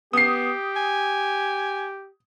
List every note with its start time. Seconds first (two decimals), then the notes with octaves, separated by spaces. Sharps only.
0.13 B3 G4 D#6 C7
0.76 G#5